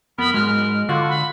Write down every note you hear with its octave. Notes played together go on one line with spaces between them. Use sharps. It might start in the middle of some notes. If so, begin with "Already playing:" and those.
F2 B3 A#4 B5
G#2 F#3 G#3 F6
D3 F4 F#4
B5